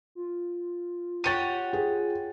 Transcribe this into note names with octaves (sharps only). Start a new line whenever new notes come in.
F4
G4 C#5 F#5 A6 D#7
G#4